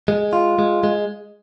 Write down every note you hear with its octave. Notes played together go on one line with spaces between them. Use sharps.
G#3
F4
G#3
G#3